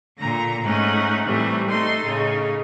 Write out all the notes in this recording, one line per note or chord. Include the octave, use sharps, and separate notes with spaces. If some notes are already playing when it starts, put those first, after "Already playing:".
A#2 D3 A#5
G#2 A3 C#4 D#4 F#5
A2 C3 E3 G3 A3
A3 D#4 A4 C6
A2 C#3 D#4